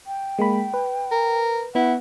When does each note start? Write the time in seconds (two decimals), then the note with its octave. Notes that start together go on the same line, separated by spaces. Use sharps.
0.07 G5
0.39 G#3 A#3 B5
0.74 B4
1.11 A#4
1.75 B3 E4 F#5